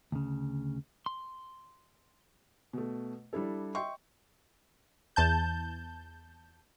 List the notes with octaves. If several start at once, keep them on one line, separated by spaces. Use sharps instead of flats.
D2 C#3
C6
B2 A3
G3 D4 E4 A4
D#5 E5 G5 C6 C#6
E2 A5 G6